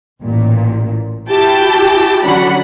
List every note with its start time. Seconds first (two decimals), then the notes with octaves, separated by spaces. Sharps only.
0.21 A1 A#2
1.29 E4 F#4 G4 G5 A5
2.24 D3 F#3 C#4 D4 F#5 B5